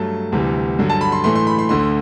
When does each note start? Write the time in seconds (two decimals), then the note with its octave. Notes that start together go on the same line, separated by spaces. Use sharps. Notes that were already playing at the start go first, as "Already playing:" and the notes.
Already playing: G2 F#3 A3 A5
0.32 D2 C3 E3 G3
0.79 G2 D3 F#3
0.90 A5
1.01 B5
1.12 C6
1.24 A2 E3 A3 C6
1.35 C6
1.47 B5
1.59 C6
1.69 D2 D3 A3 C6